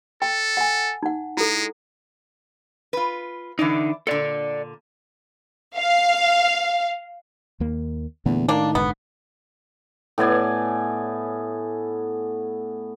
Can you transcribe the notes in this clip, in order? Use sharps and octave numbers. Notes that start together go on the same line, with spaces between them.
A4 G5
F#5 G#5
D#4 F#5
G#3 E4 A4
F4 B4
D3 E3 D4 D#4 D5
A#2 D3 A4 D5
F5
D#2 A#3
E2 A#2 D3 A3
A2 D#3 A#3 D4
F1 G#2 D3 B3
A2 B3 D5 G#5